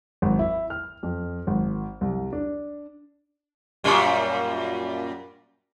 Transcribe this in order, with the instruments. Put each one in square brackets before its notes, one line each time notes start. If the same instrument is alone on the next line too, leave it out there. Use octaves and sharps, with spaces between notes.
[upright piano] G#1
E4
F6
F2
G#1
C2
D4
[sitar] F#2 A#2 G3